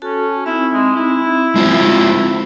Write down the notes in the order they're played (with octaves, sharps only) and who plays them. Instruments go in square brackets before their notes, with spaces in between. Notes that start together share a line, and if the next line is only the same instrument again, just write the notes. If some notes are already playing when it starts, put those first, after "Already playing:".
[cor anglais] C#4 [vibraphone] F#4 A4 A5
[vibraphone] C4 D#4 [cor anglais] E4
[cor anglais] G#3
E4
[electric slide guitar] G#3 F4 C5